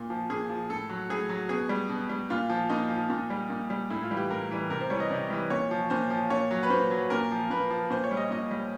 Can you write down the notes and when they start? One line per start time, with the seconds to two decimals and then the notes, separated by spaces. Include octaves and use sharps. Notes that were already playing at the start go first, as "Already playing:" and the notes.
Already playing: A#2
0.10 F3
0.30 A#2 G#4
0.50 F3
0.70 A2 A4
0.90 F#3
1.10 A2 G#4
1.29 F#3
1.49 B2 G#4
1.69 G3
1.89 B2
2.09 G3
2.30 A#2 F4
2.50 F3
2.69 A#2 D#4
2.90 F3
3.10 A#2
3.30 G3
3.50 A#2
3.70 G3
3.90 A2 E4
4.03 F4
4.11 E3 G3
4.17 G4
4.30 A2 A#4
4.51 E3 G3
4.70 C3 A#4
4.81 C5
4.90 E3 G3 C#5
5.00 D#5
5.10 C3 D5
5.30 E3 G3
5.50 A#2 C#5
5.71 F3
5.90 A#2 C5
6.10 F3
6.30 A#2 C#5
6.51 F#3
6.63 B4
6.70 A#2 C5
6.91 F#3
7.10 A#2 A#4
7.31 F3
7.50 A#2 B4
7.70 F3
7.90 A#2 C5
8.04 C#5
8.11 G3
8.17 D#5
8.30 A#2 D#5
8.51 G3